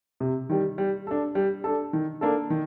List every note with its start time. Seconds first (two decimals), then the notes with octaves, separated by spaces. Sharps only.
0.20 C3
0.49 D#3 G3
0.78 G3
1.07 D4 A4
1.35 G3
1.64 D4 A4
1.93 D#3
2.21 A#3 D4 A4
2.50 D#3